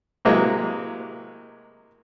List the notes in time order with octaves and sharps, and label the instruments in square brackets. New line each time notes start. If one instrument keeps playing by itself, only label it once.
[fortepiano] A2 C3 F#3 G#3 A#3